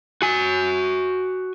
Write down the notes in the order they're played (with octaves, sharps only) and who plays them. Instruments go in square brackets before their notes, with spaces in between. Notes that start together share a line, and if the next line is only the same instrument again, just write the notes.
[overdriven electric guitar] F#4 G#5